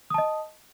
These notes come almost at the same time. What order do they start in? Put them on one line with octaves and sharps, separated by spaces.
D#6 A5 D#5